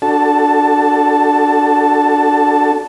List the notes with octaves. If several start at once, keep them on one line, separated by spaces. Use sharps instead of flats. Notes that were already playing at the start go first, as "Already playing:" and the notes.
D4 F#4 A4 A5